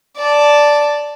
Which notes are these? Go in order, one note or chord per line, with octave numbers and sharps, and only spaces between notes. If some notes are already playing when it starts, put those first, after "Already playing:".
D5 A5